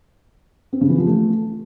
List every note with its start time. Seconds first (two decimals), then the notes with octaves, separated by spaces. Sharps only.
0.73 C4
0.81 C#3
0.90 E3
0.98 F3
1.07 A3